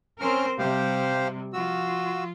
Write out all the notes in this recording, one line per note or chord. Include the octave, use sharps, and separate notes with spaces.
C4 C#4 A#4 C5 F6
C3 G3 G4 C5 F5
F3 F4 F#4 E6